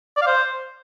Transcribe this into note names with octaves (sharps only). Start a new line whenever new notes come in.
D5
F5
C5